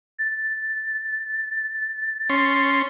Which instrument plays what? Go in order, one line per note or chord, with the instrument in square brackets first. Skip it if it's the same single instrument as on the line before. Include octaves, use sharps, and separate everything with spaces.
[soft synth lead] A6
[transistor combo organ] C#4 C6